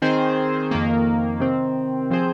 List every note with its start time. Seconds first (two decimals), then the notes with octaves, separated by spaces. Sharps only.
0.02 D#3 C4 G#4 C5
0.71 F2 D#3 A#3
1.40 C3 D#3 C4
2.10 F3 C4 G#4 C5